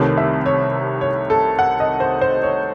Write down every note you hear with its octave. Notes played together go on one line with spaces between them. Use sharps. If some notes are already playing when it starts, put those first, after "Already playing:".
Already playing: C2 C3 D#3 A3 C#5
E5
C#5
C#5
A4
F#5
D#5
C5
C5
C#5